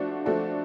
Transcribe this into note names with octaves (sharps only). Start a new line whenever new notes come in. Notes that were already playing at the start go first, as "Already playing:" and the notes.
Already playing: F3 A3 D4 F#4
F3 A3 D4 F#4 A4